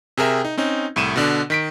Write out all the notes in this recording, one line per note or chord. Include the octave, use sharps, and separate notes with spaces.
C3 G#4 A#4 E5 G5
D#4
C4 C#4 D#4
C2 A2 D#7 E7
B2 D3 D4
D#3 B6 D7